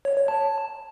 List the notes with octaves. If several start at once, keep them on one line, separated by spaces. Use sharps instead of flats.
C#5
C#5
A5